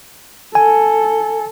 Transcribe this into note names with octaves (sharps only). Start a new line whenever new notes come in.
A4 G#5